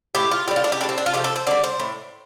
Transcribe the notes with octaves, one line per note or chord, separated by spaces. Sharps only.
A2 A3 G4
F4
A2 G3 G4
F4
D4
G4
A2 G3 D4
C4
D4
F4
C3 F3 A3 G4
A4
C5
D3 G3 D5
C5
A2